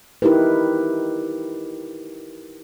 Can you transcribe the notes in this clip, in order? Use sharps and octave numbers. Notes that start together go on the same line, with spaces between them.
D#4 E4 G4 A#4 B4